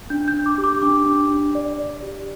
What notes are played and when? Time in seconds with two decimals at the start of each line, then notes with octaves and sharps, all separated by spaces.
0.10 D4 G6
0.28 G6
0.34 D4
0.46 D6
0.58 G4
0.64 D6
0.82 D4 D6
1.06 D4
1.30 D4
1.55 D5
1.79 D5
2.02 G4